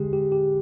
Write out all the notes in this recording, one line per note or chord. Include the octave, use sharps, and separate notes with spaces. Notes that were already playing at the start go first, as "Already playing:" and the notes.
Already playing: D3 G#3 G4
G4
G4